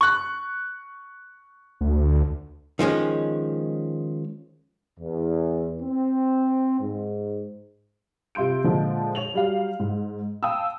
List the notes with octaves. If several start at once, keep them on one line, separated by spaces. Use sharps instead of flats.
C#6 F#6
D2
D#3 F3 G#3 C#4
E2
C4
G#2
C3 F4 C6 G6 D7
A#2 D3 F3 G#3
C#5 F7 F#7
F#3 G3 G4 F5
G#2
F5 G5 A5 D#6 E6